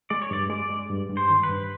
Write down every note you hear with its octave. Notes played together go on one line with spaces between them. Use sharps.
G#3 D5
C#5
G2 D5
G#3 D5
G#3
G2
G2
C5
D#3
B4
G2